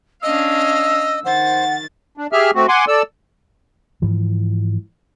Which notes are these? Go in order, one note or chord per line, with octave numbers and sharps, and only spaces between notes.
C#4 D4 D#5 F5 E6
D#3 C5 F#5 A6
D4
G4 G#4 E5 F6
A3 C4 F#4
F#5 G#5 C6 D6
A4 D5 E6
G#2 E3 F3